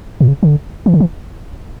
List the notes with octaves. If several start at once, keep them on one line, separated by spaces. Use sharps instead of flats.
A#2
C#3
D3
E3
D3
E3